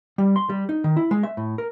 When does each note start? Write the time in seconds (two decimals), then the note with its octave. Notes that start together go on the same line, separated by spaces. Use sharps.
0.18 G3
0.36 C6
0.50 G3
0.69 D#4
0.84 D#3
0.97 E4
1.11 G#3
1.23 E5
1.37 A2
1.58 A#4